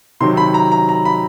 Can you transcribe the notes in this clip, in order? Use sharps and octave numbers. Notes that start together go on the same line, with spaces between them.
C3 D#3 F#3 C6
B5
A#5
A#5
A#5
B5